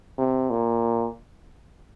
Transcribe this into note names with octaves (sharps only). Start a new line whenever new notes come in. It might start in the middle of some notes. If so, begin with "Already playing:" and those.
C3
A#2